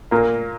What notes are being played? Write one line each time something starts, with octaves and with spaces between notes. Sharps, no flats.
A#2 A#3